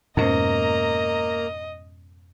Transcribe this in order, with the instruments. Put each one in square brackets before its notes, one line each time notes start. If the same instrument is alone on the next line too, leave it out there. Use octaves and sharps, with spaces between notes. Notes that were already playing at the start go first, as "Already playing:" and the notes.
[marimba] F2 C#4 C5 [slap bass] G#2 B2 [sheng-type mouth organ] A#3 A#5 [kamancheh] D#5